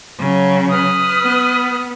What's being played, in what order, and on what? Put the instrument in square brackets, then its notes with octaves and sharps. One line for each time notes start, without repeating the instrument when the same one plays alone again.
[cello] C#3 F#3
[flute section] B4 D#6 F6
[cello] B3